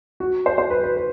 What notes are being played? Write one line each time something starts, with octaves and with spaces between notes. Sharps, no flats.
F#4
C5
C5
B4
B4
B4